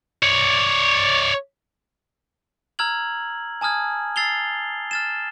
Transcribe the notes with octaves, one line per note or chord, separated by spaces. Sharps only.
C#5 D5
A#5 E6 F6 G#6 F#7
G#5 A5 D#6 F6 G#6
E6 A6 C7 F7 G7
F6 A6 E7